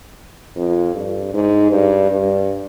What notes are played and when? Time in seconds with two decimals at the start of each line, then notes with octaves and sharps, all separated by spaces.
0.56 F2
0.95 G2
1.34 G#2
1.72 G2
2.11 G2